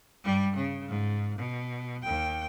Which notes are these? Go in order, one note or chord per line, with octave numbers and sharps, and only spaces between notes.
G2 G3
C#3
G#2
B2
D#2 G5